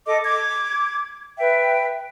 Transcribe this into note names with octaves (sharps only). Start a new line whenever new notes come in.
A4 D#5 D6
D6 G#6
B4 E5 G5